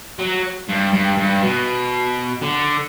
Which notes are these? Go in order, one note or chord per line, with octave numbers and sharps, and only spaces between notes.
F#3
G2
G2
G2
B2
D3